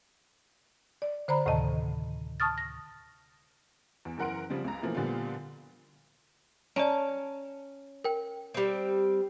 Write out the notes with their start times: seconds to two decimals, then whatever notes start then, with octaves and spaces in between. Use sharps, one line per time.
1.02 D5
1.28 D3 C5 D5 A#5 B5
1.46 D2 A2 C3 D#3 D#5 A5
2.40 A5 C#6 D#6 F6 A6
2.58 A#6
4.05 E2
4.18 F#1 E3 A#4 F#5 C6 D7
4.50 C#3 F3 G3 C4
4.64 C#2 A#5
4.82 B2 E3 F3 A3 A#3 C4
4.95 A#2 D3 F3 G3 B3 F4
6.76 C#4 D5 A5 A#5 D7
8.04 A#4 G5
8.54 G3 C4